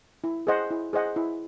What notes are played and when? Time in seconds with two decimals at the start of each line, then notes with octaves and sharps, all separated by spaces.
0.24 E4
0.47 G#4 C5 D#5 F#5
0.70 E4
0.93 G#4 C5 D#5 F#5
1.16 E4